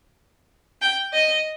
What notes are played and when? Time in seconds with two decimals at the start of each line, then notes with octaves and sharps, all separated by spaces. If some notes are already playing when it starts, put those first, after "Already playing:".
0.82 G5
1.13 D#5